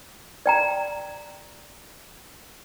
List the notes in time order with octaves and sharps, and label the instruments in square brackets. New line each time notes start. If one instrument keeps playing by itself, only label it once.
[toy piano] D5 G5 A#5